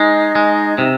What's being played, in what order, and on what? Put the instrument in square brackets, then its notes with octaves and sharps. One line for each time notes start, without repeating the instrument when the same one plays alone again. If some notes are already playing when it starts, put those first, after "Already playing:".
Already playing: [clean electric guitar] G#3 [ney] D#4
[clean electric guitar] G#3
[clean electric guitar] C3 [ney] D#4